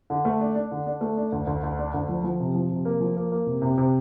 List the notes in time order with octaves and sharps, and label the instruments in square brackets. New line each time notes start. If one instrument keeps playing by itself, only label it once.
[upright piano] D3
A3
D4
D4
D3
D4
A3
D4
D2
D2
D2
D4
D2
F3
F3
C3
F3
C3
A#3
F3
A#3
A#3
C3
C3
C3